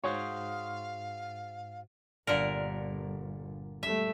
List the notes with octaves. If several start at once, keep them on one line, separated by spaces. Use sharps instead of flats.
G#2 F#4 G#4 C5 C#5 F5
G1 A#2 D3 A#4
G3 A3 E5